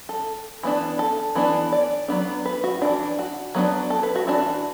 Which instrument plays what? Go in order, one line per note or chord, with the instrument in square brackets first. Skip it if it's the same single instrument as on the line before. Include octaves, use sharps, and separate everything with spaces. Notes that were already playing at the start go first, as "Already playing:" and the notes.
[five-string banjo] A4
E3 B3 D4
A4
E3 B3 D4
D5
F#3 B3 D4
B4
F#4
E3 D4
F#4
F#3 B3 D4
A4
B4
F#4
E3 D4 F#4